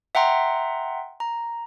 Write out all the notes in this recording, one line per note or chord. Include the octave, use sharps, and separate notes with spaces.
E5 F#5 G5 A#5 C6
A#5